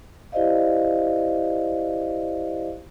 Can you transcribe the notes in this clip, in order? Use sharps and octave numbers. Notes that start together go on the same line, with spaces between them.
E4 G4 C5 D5 D#5 F5